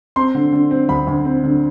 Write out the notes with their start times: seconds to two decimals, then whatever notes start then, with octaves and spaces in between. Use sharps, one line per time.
0.16 C4 C6
0.35 D3
0.52 D3
0.71 C4
0.89 D2 B5
1.07 D2
1.25 C4
1.44 D3